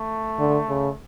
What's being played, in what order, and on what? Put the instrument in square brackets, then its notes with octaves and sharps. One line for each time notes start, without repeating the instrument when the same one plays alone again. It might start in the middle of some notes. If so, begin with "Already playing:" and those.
Already playing: [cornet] A3
[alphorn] D3
C#3